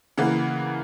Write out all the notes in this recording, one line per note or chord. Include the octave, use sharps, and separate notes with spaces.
C#3 E3 A#3 F#5